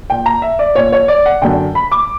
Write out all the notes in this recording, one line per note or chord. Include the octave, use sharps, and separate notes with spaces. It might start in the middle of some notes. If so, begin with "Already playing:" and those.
A#2 G5
A#5
E5
D5
A#2 C#5
C#5
D5
F#5
F#2 D3 G5
B5
D6